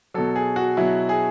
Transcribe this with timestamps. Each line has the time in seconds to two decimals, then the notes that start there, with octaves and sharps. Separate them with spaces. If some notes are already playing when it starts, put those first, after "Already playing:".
0.14 B2 F#3 A4
0.36 G#4
0.56 F#4
0.77 B2 F#3 E4
1.09 G#4